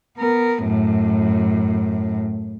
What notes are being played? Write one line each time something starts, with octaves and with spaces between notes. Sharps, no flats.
B3 A#4
F#2 A2